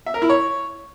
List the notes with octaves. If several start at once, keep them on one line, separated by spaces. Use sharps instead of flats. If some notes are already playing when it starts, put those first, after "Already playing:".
E5
A#4
E4
C#5